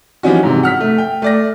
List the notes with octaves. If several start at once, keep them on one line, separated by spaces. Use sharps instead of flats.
E3 F3 G3 C#4 D#4 F#4
G#2 C3
F#5 F6 B6
A3
G5
A3 D5 A#6